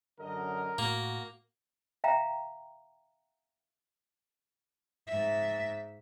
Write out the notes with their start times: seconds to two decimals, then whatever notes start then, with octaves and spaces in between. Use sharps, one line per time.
0.19 F#2 D3 A#4 D#5
0.78 A2 A#3 F#4
2.04 E5 F5 G5 A#5
5.08 G#2 E5